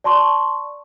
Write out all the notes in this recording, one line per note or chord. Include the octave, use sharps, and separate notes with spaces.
D5 A5 C6 C#6